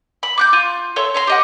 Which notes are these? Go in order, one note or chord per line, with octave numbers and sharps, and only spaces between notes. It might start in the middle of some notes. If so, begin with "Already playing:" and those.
B5
D6 F#6 G6
F4
A4 C#5 E5 C6
C#5 A#5 C6
G4 D#5 F#5